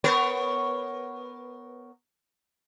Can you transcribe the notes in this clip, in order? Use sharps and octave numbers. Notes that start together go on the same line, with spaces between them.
B3 A#4 C#5